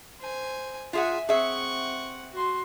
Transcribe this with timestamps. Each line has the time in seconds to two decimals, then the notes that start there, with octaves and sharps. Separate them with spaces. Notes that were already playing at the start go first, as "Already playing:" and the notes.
0.20 C5 G#5
0.93 F4 G#4 E5 F#5 G#5
1.29 C4 G#4 E5 F#5 C#6
2.32 F#4 C6